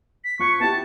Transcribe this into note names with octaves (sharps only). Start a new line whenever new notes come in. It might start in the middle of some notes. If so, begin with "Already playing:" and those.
B6
F3 C#6 F#6 G#6
B3 E4 G4 A5